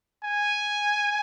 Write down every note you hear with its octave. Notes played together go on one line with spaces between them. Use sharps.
G#5